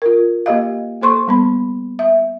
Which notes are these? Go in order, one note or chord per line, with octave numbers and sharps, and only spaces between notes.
F4 A#4
A#3 G4 D#5 F5
A#3 A4 C5 C6 C#6
G3 B3 B5
E5